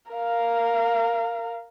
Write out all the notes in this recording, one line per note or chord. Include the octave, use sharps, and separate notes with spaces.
A#4 F5